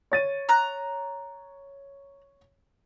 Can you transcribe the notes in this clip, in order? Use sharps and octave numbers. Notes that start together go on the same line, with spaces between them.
C#5 A6 D#7
A#5 F#6